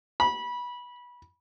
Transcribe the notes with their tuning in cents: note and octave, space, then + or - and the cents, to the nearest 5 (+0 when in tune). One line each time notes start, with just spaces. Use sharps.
B5 -20